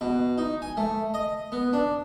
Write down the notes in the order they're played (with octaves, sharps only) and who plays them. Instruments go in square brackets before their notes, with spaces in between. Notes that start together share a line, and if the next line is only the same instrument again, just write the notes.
[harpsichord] B2
D#4
G#5
A3
D#5
B3
D4